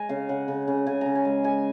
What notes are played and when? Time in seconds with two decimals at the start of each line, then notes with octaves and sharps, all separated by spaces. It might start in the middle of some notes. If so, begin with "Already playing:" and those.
Already playing: G#3 G#5 A#5
0.09 C#3 F5
0.29 C#3 F#5
0.48 C#3
0.68 C#3
0.86 C#3 G#5
1.01 C#3 A#5
1.15 G#5
1.25 G#3
1.44 G#3 G#5